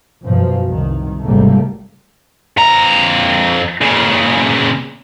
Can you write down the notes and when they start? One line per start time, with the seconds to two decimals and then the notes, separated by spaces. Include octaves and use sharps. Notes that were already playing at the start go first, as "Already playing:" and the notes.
0.23 F#2 B2 F3
0.66 C2 D#3
1.24 G#1 C#2 C3 G3 A3 A#3
2.57 F2 A#5
3.82 A#2 C#3